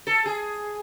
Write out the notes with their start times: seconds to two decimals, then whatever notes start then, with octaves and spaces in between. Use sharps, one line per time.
0.07 A4
0.26 G#4